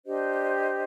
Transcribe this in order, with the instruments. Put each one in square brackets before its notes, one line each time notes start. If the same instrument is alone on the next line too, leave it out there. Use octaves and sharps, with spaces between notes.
[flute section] D4 G4 C5 D#5